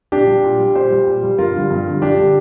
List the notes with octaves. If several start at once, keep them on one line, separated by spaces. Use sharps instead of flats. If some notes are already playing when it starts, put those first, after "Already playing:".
A#2 D4 G4
G3
A#2
G3
A#2 G4 C5
G3
A#2
G3
G2 F4 A#4
D3 G3
G2
D3 G3
G2 D4 G4
D3 G3